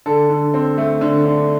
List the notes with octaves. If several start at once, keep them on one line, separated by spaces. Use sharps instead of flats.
D3 A4
D3
C4
A3
D3
D3